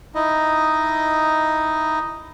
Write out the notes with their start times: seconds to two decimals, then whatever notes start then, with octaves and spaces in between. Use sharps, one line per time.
0.15 D#4 E4 D#5